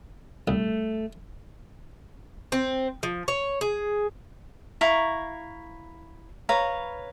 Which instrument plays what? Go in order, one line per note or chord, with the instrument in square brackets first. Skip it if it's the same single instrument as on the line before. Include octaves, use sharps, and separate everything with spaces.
[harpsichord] C2 [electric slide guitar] A3
[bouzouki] C4
F3
C#5
G#4
[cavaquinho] E4 F5 A#5 C#6
B4 C#5 F5 A#5